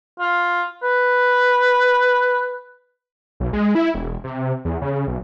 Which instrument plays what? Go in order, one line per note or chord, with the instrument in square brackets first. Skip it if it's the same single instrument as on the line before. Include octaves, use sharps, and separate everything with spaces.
[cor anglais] F4
B4
[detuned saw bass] B1
G#3
E4
E1
C3
E2
C#3
B1